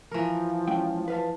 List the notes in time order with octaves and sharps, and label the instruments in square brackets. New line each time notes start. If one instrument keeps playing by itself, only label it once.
[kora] E3 A#4 [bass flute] F3
[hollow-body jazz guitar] G#3 C#4 G5
B4 F5 A5